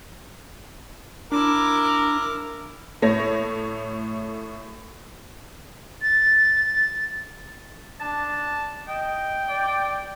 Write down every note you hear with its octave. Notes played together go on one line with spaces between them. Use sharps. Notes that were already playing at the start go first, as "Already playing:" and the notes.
D4 E4 A#4 D6
A2 A3 C#5 A#6
A6
D4 A5
D#5 G5
D5